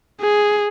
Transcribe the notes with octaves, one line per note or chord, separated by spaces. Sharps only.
G#4